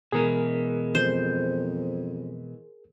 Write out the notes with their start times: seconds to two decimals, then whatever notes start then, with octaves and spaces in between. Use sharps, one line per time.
0.12 B2 E3 G#3 G#4 A#4
0.95 F2 C5